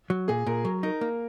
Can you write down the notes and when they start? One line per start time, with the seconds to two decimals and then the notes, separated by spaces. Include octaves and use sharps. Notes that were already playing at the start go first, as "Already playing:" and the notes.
0.10 F#3
0.28 A#2 G#4
0.46 A#2 A#4
0.64 F#3 A#4
0.83 D#4 A#4
1.01 A#3